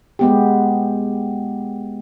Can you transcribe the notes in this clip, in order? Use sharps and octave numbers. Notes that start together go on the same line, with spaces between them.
G#3 B3 G4